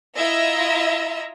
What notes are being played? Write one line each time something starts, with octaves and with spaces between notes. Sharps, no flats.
E4 F4 D#5 E5 A#5 E6